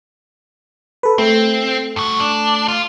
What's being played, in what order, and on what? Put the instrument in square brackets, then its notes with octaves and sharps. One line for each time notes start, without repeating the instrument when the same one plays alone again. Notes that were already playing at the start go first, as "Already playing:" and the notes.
[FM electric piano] A4 B4
[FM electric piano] A3 [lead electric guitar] C4
[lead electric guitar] G2 F#4
D4
F4